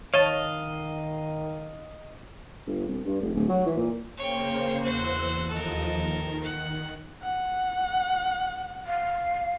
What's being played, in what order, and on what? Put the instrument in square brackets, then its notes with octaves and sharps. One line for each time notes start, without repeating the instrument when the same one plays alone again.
[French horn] D#3 [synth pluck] C#5 A5 [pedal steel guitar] D#5 F5
[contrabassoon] G1
C2
G2
F1
D1
F#3
E3
A#2
[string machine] C#3 A#3 C5 [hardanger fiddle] C#5 G5
[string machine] E2 E6 F#6 [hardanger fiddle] F#4 C5
[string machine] D#2 F3 D#5 [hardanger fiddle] A4 A#4
[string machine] D#3
[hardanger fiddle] F#5
[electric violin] F#5
[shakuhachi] F5